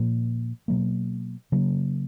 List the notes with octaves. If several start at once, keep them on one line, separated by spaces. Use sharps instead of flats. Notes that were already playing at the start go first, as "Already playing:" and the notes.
Already playing: A#2 F3 A#3
B2 F#3 A#3
C#3 F#3 A#3